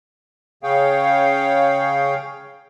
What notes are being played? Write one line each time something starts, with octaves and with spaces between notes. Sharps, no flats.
C#3 G#4 C#5 F5 G5